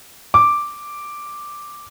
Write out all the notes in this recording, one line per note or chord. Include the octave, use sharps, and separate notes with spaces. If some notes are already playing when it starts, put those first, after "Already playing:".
D6